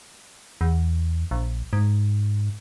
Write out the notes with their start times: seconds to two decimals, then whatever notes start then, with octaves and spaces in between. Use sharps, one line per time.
0.61 E2
1.31 A#1
1.73 G#2